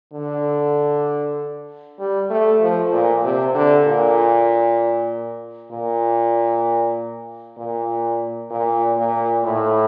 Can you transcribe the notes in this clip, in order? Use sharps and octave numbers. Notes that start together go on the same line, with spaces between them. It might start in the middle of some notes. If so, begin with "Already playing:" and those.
D3
G3
A3
F3
A#2
C3
D3
A#2
A#2
A#2
A#2
A#2
A2